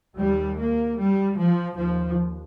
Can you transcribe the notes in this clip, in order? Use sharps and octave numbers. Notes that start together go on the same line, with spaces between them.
D#2 G3
A#3
G3
F3
D#2 F3